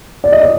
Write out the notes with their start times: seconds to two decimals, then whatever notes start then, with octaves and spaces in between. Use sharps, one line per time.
0.24 D5
0.32 D#5
0.42 D5